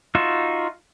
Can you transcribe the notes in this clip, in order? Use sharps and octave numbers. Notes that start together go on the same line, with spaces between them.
D#4 F4 F#4 E5